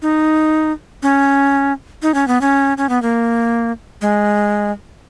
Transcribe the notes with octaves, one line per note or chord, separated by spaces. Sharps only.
D#4
C#4
D#4
C#4
B3
C#4
C#4
B3
A#3
G#3